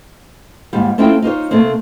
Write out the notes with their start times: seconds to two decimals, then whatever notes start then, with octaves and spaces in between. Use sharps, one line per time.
0.73 D#2 G#2 G3
0.98 A3 C4 C#4 E4 F4 G5
1.22 D#4 F4 C5 C#5
1.51 C3 A3 A#3 C4